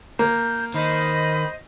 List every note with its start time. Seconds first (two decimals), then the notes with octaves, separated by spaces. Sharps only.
0.19 A#3 G6
0.74 D#3 C5 D#5 B5